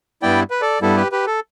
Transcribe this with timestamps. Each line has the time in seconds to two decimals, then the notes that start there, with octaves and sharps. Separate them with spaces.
0.22 G2 G3 B3 E4 D5 G5
0.50 B4
0.62 A4 D5
0.82 G2 G3 B3 E4 A4
0.96 G4 B4
1.12 G4 B4
1.27 A4